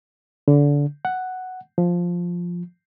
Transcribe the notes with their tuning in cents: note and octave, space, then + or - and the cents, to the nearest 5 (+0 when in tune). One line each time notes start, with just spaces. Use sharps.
D3 -25
F#5 +5
F3 +5